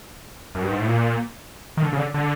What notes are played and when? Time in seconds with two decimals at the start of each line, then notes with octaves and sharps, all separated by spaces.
0.55 F#2
0.63 G2
0.71 G#2
0.80 A2
0.87 A#2
1.77 D#3
1.83 D3
1.92 C#3
1.98 D3
2.14 D3